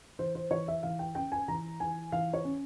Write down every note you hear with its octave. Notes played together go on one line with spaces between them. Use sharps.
E3 C5
C5
E3 C#5
E5
E3 F5
G5
C#4 G5
G#5
E3 A#5
E3 G#5
E3 F5
C#5
C#4